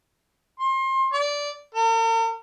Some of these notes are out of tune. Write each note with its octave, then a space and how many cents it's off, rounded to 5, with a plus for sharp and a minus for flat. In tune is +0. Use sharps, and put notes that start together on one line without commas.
C6 +30
D5 -15
A#4 -45